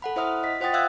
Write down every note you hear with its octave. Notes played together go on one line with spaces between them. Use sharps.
A4 F#5 B5
E4 C5 E5 F#5 D#6 F6
D#5 B6
F4 C5 F#5 G5 D#6 A6
E5 F5 D#6 E6 F#6 G#6